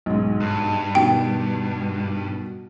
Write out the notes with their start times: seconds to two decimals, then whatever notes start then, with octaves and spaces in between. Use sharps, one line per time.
0.06 B1 G#2
0.40 G2
0.95 B2 D#3 G3 G5